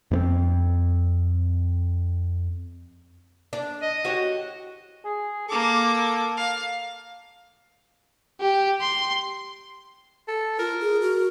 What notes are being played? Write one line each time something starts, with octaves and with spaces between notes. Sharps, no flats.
F2 B3 C4
D4
D#5
F#4 G4 C#5
G#4
A#3 A4 D6
F5
G4
C6
A4
F4 A#4
G#4
F#4